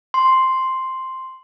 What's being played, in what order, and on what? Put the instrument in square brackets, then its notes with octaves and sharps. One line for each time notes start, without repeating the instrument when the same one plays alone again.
[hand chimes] C6